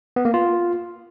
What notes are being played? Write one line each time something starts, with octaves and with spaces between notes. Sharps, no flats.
B3
A#3
F4